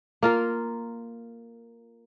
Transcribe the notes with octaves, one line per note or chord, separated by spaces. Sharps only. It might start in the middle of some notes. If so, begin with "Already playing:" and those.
A#3 F4 A#4